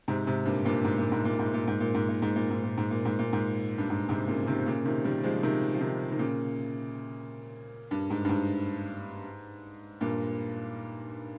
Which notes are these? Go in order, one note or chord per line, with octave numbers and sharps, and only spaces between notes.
G#2 C3
G#2 C3
G2 A#2
G2 A#2
G#2
A#2
G#2
A#2
G#2
A#2
G#2
A#2
G#2
A#2
G#2
A#2
G#2
A#2
G#2
A#2
G#2
A#2
G#2
G2
G#2
G#2 C3
A#2 C#3
C3 D#3
A#2 C#3
C3 D#3
D#3 G3
F3 G#3
C3 D#3
F3
C3 D#3
D#3
A#2 C#3
G2
G#2
G2
G#2
G2 A#2